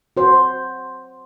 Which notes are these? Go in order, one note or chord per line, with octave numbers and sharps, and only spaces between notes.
F#4 C5